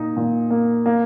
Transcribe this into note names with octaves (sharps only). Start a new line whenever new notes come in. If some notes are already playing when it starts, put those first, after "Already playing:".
Already playing: A#2 D#4
A#2
A#3
A#3